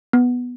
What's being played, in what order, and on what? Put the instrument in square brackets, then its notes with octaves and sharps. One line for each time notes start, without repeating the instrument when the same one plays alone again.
[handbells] B3